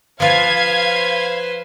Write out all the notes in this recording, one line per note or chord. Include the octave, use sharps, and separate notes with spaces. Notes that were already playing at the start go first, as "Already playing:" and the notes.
F3 F4 B4 C5 F5 G#6